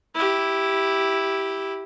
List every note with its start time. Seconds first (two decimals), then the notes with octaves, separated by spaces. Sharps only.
0.15 E4 G4